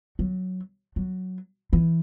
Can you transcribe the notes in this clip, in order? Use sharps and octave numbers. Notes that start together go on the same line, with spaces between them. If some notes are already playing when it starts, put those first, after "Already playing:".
F#3
F#3
E3